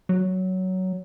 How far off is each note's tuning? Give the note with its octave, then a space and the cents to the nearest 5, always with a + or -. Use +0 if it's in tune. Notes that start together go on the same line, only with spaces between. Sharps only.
F#3 +10